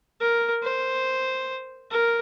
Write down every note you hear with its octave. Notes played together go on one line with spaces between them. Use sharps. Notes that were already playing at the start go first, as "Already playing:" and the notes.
A#4
C5
A#4